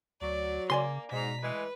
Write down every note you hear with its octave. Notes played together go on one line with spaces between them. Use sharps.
D2 F#3 D5
C#3 A#3 D5 G#5 C6
G#2 B2 A#5 B6
A2 E3 G#3 B4